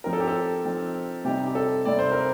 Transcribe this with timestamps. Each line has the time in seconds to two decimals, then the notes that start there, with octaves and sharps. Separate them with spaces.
0.04 F3 C4 D#4 A#4
0.13 A4
0.20 G4
0.28 A4
0.65 F3 C4 D#4
1.25 C3 G3 C4 D#4 G4
1.46 G4
1.55 A4
1.85 C3 G3 C4 D#4 D5
1.99 C5
2.12 A#4